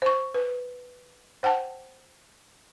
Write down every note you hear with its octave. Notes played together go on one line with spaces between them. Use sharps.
C5 C#6
B4
C5 F#5 G5 A5